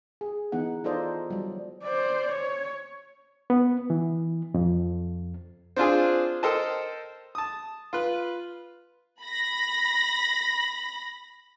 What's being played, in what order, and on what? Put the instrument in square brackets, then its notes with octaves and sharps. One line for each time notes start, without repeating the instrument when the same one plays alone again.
[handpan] G#4
E3 B3 D#4 F#5
D#4 F4 A4 C5 D5 D#5
F#3 G3
[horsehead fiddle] C5 D5
C#5
[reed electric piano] B3
E3
F2
[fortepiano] C4 D4 F4 G#4
A4 A#4 C5 D#5 G5 A5
A5 D#6
F4 B4
[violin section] B5 A#6